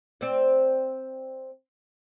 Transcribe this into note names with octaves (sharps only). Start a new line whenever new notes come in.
C4 D5